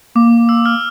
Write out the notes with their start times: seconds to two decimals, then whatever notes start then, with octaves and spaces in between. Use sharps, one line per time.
0.15 A#3 D6
0.49 E6
0.66 F6